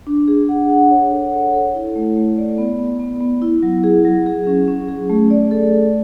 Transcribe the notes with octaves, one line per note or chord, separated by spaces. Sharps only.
D4
G#4
F#5
F#5
C#5
A4
C#5
A4
E4
A3
A3
D5
B3
B3
B3
B3
E4
F#3
G#4
F#3
G#4
C#4
C#4
G#4
A3
D5
A4
A4